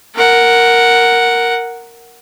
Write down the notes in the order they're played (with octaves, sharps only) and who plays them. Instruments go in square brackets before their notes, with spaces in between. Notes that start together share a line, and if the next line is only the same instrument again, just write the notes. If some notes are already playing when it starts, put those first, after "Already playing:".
[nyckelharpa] A#4 F#5